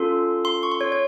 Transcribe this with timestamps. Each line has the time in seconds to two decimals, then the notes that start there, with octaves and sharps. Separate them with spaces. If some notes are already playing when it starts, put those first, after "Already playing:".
Already playing: C#4 F4 A4 C6
0.45 C6
0.63 C#6
0.72 C6
0.81 C#5
0.92 C#5